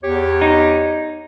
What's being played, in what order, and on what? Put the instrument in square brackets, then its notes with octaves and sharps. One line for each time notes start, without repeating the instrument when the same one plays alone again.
[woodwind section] E2 G4 C#5
[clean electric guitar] D#4